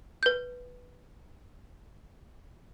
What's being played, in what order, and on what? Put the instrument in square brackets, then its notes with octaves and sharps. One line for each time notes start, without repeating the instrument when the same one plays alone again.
[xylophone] B4 G6